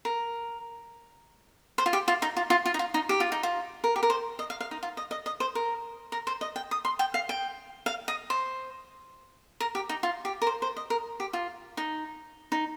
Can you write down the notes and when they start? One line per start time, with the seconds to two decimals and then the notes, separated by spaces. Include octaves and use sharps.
0.05 A#4
1.78 C5
1.86 F4
1.93 G4
2.08 F4
2.22 D#4
2.37 F4
2.50 F4
2.66 F4
2.74 D#4
2.79 F4
2.94 D#4
3.09 G4
3.20 F4
3.32 D#4
3.43 F4
3.84 A#4
3.96 G4
4.03 A#4
4.10 C5
4.39 D#5
4.50 F5
4.60 F5
4.71 D#4
4.83 F4
4.97 D#5
5.11 D#5
5.26 D#5
5.40 C5
5.55 A#4
6.12 A#4
6.27 C5
6.41 D#5
6.56 G5
6.71 D#6
6.85 C6
6.99 G5
7.14 F5
7.29 G5
7.86 F5
8.08 D#5
8.30 C5
9.60 A#4
9.75 G4
9.89 D#4
10.03 F4
10.25 G4
10.42 A#4
10.47 C5
10.62 C5
10.77 D#5
10.90 A#4
11.20 G4
11.33 F4
11.77 D#4
12.52 D#4